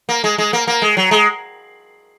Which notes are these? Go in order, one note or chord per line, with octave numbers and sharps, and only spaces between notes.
A#3
G#3
G#3
A#3
A#3
G#3
F#3
G#3